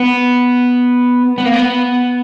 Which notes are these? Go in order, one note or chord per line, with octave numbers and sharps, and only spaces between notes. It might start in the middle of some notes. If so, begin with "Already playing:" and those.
Already playing: B3
B3
A#3
B3